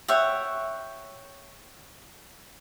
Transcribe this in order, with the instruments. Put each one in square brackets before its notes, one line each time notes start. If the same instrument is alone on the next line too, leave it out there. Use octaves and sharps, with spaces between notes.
[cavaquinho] C#5 E5 F#5 G5